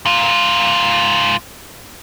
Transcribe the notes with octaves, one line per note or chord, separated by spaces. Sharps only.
G#2 F4